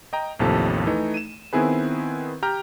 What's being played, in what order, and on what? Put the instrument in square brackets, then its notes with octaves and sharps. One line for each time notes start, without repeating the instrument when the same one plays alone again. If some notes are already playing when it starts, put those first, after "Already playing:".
[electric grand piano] D#5 G5 A#5
A1 D#2 C3 F3 A4 A5
E3 A3 D#4
D#7 E7
D#3 B3 C4 E4 G#4 B4
G4 G5 A#5 F6